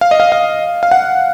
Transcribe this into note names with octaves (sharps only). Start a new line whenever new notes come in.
F5
D#5
F5
F5
F5
F#5